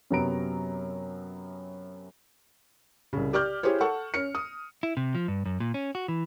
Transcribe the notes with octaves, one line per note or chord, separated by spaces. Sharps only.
F#2 C3 F#3 B3 A#5 D7
C2 C#3
G4 D5 D6 F6 G6
E4 G4 G#4 C5 C#5
A4 F#5 C#6
C#4 F6 C#7
D#6
E4
C3
F3
G2
F#2
A#2
C#4
F#4
E3